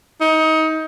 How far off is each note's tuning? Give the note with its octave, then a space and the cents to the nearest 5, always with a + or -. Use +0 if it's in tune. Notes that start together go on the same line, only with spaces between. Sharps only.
D#4 +25